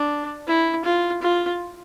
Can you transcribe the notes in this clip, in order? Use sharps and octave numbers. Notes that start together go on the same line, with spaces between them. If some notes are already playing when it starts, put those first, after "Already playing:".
Already playing: D4
E4
F4
F4